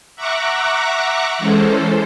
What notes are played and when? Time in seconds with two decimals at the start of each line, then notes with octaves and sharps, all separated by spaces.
0.16 E5 F#5 A#5 C#6 D6 F#6
1.38 E3 G#3 C#4 A4 C5